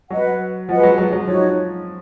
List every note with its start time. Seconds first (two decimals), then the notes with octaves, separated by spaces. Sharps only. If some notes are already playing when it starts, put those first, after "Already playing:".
0.10 F#3 B4 D#5 F#5
0.69 F3 B4 D#5 F#5
0.80 G#3
0.83 F#3
0.98 F#3
1.13 F#3
1.27 F3 D#4 F#4 C#5